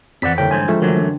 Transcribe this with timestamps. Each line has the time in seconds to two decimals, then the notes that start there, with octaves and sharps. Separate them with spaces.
0.22 F2 E3 C4 D5 F#5 B6
0.38 A2 D3 G3 A#3 G5
0.51 G#2 C5 G#5
0.68 F3 G#3 A3 C4 E4
0.82 F#2 E3 F#3 A3 D4
0.97 C4